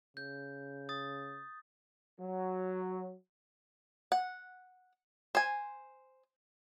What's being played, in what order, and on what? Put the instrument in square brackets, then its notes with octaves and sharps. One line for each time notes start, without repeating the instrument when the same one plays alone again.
[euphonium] C#3 [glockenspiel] G6
[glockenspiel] D#6 A6
[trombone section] F#3
[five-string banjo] F#5
C5 G#5